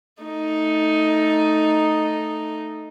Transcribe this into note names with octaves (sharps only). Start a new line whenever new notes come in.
A3 D#4